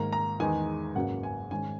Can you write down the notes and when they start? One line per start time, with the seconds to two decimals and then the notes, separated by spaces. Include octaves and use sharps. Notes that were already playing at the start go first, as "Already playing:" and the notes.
Already playing: G#2 D#3 A#3 A#5
0.12 A#5
0.40 E2 D#3 G#3 D#4 G#5
0.95 G#1 F#2 C#3 F#3 A#3 F#5
1.23 G#5
1.51 G#2 D#3 G#3 C#4 G#5